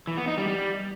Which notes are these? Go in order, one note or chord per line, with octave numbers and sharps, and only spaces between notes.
E3
B3
D#4
G3
G3